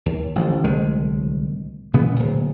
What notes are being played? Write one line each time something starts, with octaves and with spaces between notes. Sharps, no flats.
D#2
A1 D3 F3
D1 C2 D#3 G#3
A#2 C#3 E3 B3
D1 A#2